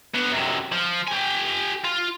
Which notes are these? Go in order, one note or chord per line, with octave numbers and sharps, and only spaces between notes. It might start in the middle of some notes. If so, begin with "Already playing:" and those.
B3 D4
F#2 C3
F3
G4 G#5
F4